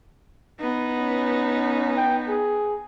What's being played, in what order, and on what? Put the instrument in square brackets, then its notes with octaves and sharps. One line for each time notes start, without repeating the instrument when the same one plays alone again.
[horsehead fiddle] B3 D#4
[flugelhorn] C#4
G5
G#4